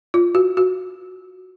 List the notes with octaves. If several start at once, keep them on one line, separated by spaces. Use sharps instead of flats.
F4
F#4
F#4